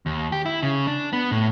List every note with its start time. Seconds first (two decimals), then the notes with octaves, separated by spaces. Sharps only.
0.06 D#2
0.32 G4
0.46 E4
0.63 C#3
0.87 D4
1.13 B3
1.31 A2